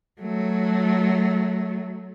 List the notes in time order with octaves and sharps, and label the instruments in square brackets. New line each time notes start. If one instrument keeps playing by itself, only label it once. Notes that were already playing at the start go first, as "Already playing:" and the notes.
[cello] F#3 A3